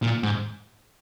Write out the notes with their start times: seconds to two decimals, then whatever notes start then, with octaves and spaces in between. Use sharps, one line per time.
0.03 A#2
0.23 G#2